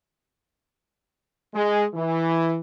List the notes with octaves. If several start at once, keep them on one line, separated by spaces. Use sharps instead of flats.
G#3
E3